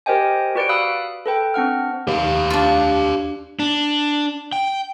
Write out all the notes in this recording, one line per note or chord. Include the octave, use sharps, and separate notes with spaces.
G4 A#4 C5 D#5 G5 G#5
F#4 G4 B4 D5 C#7 D7
F5 B5 D#6 E6 F#6
A4 B4 G5
C4 D4 F#5 F6
D#2 G4 F5
D4 F4
D4
G5